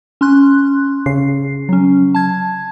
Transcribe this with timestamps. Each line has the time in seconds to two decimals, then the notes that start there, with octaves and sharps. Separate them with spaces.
0.21 C#4 C6 F#6
1.06 C#3 C7
1.69 F#3 C#4
2.15 A5 G#6